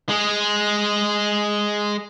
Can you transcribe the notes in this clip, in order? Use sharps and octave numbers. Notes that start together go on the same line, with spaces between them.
G#3 G#4